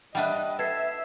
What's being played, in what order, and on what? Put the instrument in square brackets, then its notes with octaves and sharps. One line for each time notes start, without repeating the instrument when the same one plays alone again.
[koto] G3 D4 B4 [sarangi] D#5 [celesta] E5 F#5 G5
[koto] A4 [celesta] B4 G#6 C7 [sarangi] E5